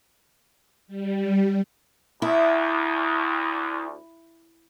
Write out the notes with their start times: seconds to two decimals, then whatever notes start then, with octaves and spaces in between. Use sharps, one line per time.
0.88 G3
2.22 D2 E4